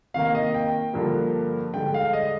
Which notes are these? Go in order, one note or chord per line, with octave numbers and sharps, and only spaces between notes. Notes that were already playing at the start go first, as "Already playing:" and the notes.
C3 D#3 A#3 F5
D#5
G5
G2 D3 F3 A#3
G2 D3 G#3 G5
F5
D#5